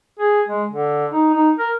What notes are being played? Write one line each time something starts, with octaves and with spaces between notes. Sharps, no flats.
G#4
G#3
D3
D#4
D#4
A#4